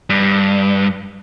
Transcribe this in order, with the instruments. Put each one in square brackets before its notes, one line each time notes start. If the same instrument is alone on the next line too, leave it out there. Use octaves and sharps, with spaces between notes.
[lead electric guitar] G2